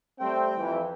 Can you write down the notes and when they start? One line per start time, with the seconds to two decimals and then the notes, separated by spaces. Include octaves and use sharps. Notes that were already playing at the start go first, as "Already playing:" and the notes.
0.20 G3 A3 C4 G5
0.58 F2 E3